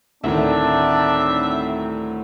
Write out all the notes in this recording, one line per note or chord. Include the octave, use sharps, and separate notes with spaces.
D2 A2 D#3 G3 C4 D4 D#4 E5